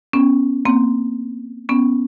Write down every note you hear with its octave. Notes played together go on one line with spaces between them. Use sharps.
B3 C#4
A#3 C4
B3 C#4